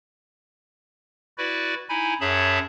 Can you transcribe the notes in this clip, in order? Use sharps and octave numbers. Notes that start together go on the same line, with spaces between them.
E4 F#4 B4 D5
D#4 E4 G#5 B5
F#2 G#4 C#5 E5 A5 B5